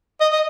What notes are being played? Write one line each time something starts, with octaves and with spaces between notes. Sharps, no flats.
D#5
D#5